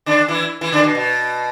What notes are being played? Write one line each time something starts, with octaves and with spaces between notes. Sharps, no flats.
D3 D4
E3 E4
E3 E4
D3 D4
B2
B2